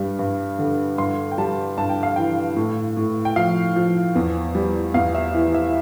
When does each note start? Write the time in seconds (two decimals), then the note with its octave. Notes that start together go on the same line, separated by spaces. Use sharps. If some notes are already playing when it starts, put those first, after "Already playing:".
Already playing: G2 G3
0.19 G2
0.59 D3
0.98 G2 C6
1.32 G5
1.38 G3 A5
1.78 G2 A5
1.90 G5
2.03 F5
2.16 E3 G5
2.56 A2
2.97 A2
3.25 G5
3.36 F3 F5
3.76 F3
4.15 E2
4.55 G3
4.94 E2 F5
5.15 E5
5.34 E3
5.54 E5